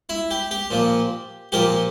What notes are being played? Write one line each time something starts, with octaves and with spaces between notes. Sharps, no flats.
E4
G4
G4
A#2 F3 A#3
A#2 F3 A#3 G4